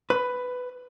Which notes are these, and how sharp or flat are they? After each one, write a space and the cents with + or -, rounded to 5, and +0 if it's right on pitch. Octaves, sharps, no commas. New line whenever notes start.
B4 +10